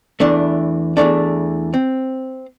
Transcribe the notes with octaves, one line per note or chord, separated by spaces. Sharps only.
E2 E3 A3 D4
E2 E3 A3 D4
C4